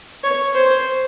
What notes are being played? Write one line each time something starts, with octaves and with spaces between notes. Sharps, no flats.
C#5
C5